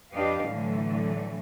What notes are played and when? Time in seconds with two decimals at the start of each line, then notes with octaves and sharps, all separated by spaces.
0.14 F2 D4 G4 B4 D#5 F5
0.46 A2 D3 E3 F#3 A3